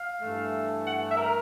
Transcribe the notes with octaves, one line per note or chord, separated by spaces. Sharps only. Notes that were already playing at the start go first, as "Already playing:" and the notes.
Already playing: F5
G2 E3 A3
F#5
E5
A#4